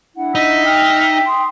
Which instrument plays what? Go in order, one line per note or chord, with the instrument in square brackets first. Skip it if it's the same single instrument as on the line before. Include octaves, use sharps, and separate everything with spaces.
[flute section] D4 E4 F#5
[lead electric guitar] D#4 [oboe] E5
[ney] G5 [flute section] F6
[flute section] C6 D#6